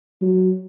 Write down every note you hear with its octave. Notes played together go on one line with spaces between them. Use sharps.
F#3